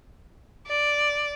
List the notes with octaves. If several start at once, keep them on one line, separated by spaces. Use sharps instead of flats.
D5